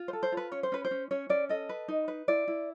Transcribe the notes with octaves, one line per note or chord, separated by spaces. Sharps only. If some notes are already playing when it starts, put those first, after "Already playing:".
Already playing: F4
C5
A4
C5
F4
B4
C#4 C#5
C5
C#4 B4
C5
C#4
C#4 C#5
C#4 D5
A4 D#5
B4
D#4
B4
E4 D5
E4